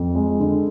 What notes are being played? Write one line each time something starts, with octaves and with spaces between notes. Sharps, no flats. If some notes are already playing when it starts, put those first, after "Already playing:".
Already playing: F2
G#3
D3